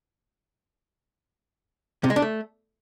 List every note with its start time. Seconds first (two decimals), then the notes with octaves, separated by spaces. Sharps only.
2.04 C3
2.10 G#3
2.16 D4
2.22 A3